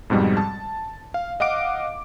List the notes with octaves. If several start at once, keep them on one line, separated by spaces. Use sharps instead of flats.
F2 G#2 B2 G3
A5
F5
D#5 F5 F#5 D6 D7